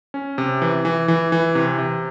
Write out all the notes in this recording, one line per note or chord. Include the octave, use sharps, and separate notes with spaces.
C#4
C3
E3
E3
E3
E3
C3
C3